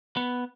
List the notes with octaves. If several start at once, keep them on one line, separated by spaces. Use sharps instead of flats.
B3